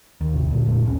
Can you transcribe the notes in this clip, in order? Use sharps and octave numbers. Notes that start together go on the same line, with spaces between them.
D#2
G#1 C3
D2 A#2
F1 A#2 A3
A1 D#2 C#4